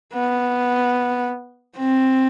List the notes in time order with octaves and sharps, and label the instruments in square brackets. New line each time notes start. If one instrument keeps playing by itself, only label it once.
[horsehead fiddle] B3
C4